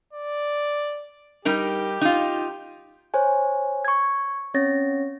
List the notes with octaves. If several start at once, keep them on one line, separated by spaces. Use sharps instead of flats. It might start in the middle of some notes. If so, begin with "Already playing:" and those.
D5
G3 D#4 G4 A#4
D#4 F4
C5 C#5 G#5
C#6 G#6
C4 C#4 C#5 A6 A#6